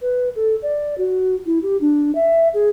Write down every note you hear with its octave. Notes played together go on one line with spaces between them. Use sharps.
B4
A4
D5
F#4
E4
G4
D4
E5
G#4